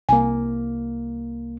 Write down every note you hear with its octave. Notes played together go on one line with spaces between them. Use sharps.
C2 A#3 G#5